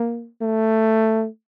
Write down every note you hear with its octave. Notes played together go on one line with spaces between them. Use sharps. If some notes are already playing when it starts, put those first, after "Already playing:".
Already playing: A#3
A3